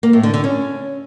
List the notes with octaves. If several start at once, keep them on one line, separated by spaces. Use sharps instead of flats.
A#3
A2
D3
D3
C#4